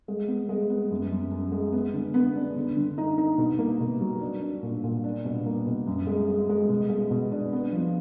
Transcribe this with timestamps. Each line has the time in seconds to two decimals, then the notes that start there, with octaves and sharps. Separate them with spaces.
0.08 G#3
0.28 B3
0.49 G#3
0.70 B3
0.91 F#2
1.12 F#2
1.31 F#2
1.52 G#3
1.72 B3
1.94 D3
2.14 B3
2.36 D4
2.56 D3
2.77 D3
2.98 D#4
3.18 D#4
3.38 B2
3.59 A#3
3.80 B2
4.01 F#3
4.21 D4
4.42 D4
4.63 A#2
4.84 A#2
5.04 D4
5.25 B2
5.46 A#3
5.67 B2
5.87 F#2
6.07 G#3
6.28 G#3
6.49 G#3
6.69 B2
6.89 G#3
7.11 B2
7.31 D4
7.53 B3
7.72 F3